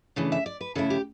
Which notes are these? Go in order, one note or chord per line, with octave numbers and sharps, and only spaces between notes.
C#3 E3 A3 D4
E5
D5
B4
C#3 E3 A3 E4 A4
G4